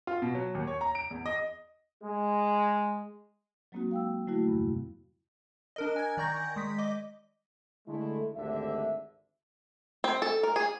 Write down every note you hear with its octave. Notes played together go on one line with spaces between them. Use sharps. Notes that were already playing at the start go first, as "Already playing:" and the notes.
F4
B2
F#3
D#2
C#5
A#5
D7
E2
D#5
G#3
F#3 G#3 A#3 C4 D#4 F#4
F5 G5 E6
D3 F#3 G3 A3 E4 F#4
E2 G2 C3
D4 A#4 D#5
G#5 G#6
D#3 D5 A#5 C#6 G6 A#6
G#3 D#6 B6
D#5 D6
D3 G#3 A3 E4
G#1 D2 D3 G4 E5
C4
A4
A#4
G#4